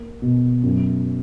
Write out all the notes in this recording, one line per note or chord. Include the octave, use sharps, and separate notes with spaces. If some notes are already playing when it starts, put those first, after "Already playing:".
Already playing: A#3
B2
F#2